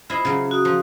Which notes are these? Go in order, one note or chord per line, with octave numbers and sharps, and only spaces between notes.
E4 F4 C5 D#5
C#3 F#3
F#4 D#6
F3